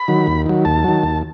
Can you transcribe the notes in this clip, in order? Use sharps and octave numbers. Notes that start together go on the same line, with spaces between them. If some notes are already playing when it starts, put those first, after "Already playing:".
Already playing: B5
D#3 F#3
D#2
D#3 F#3
D#2 A5
D#3 F#3
D#2